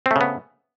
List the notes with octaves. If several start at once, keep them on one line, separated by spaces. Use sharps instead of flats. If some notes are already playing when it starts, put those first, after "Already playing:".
C#3 A3 B3 C4